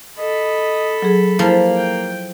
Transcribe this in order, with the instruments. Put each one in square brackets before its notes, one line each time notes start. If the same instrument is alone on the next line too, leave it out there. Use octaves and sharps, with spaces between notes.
[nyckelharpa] A4 B5 [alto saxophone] D#5
[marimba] F#3 G#4
[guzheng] F3 [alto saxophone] A#3 [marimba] E4
[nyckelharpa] G5